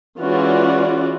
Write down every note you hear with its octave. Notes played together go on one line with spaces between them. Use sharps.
E3 G#3 C#4 F4 F#4 D5